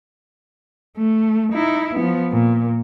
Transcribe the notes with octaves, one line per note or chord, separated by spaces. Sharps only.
A3
D#4 E4
F3 B3
A#2